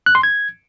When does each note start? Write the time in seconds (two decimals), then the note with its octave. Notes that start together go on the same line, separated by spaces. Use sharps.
0.06 F#6
0.15 C6
0.23 G#6